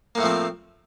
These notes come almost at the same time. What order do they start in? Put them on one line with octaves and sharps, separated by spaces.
A#3 A2 A3 F3 C4